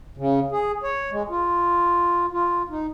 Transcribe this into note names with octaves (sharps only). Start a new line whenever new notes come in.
C#3
G#4
C#5
G#3
F4
F4
D#4